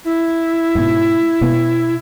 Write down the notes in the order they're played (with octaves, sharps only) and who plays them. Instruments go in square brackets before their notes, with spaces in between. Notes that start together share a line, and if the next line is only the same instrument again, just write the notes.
[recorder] E4
[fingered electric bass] G#2 B2
B2 B3